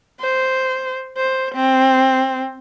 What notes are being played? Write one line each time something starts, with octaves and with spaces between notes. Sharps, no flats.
C5
C5
C4